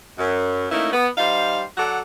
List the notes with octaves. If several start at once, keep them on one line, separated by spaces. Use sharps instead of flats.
F#2
A3 A#3 C#4 D#4 E4
B3
G3 D#4 C5 F5
F#3 A4 D5 F#5